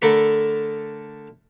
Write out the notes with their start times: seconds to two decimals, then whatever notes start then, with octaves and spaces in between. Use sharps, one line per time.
0.02 D3 A3 A#4 B5